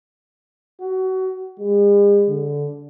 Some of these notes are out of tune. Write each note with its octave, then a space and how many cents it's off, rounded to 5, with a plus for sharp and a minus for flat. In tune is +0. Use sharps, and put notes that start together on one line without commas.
F#4 +25
G#3 -45
D3 -15